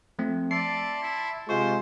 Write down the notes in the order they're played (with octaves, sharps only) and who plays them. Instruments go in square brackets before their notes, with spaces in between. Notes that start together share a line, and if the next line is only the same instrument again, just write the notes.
[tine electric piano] F3 A3 C4
[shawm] D5 [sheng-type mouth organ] E5 A5 C6 [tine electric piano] C7
[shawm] E4
[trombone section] C3 G#3 F4 [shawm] C5 [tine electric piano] C#6